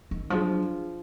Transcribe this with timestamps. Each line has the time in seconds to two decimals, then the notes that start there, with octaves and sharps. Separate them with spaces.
0.11 D#3
0.30 F3 F#3 D4 G#4